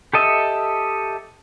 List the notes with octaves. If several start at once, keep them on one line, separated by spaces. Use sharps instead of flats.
G4 A4 D#5 E5